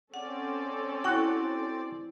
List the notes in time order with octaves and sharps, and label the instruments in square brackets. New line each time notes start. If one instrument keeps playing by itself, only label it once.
[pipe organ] C4 D5 [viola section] C#4 A4 [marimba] F#5
[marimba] E4 G5 C6 [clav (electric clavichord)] F#4 F#5